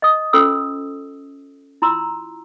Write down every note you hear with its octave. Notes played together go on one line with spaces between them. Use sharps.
D#5 D#6
C#4 F4 A4 C5 D#6 E6
E4 F4 A#5 C6 E6